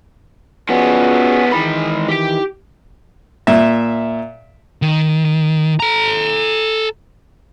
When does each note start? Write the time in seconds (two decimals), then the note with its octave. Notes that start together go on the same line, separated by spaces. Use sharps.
0.69 F3 B3 C#4 F#4 G#4
1.53 D#3 E3 G#3 B5
2.09 G4 G5
3.47 A#2 E5
4.82 D#3
5.80 A4 A#5